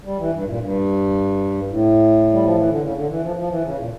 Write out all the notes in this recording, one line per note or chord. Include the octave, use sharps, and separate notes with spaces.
G3
E3
G2
A#2
G2
A2
G3
F3
E3
D3
C#3
D3
E3
F3
F3
E3
C#3
A#2